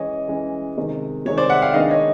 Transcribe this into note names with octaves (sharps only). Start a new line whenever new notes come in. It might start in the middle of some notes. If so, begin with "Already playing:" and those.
Already playing: E3 G#3 C#4 C#5 D#5
E3 G#3 C#4
C3 D#3 G#3
C3 D#3 G#3 C#5
C5 D5
E5 F#5
F5 G5
D#3 G#3 B3 D4 D#5 F5
C#5 D#5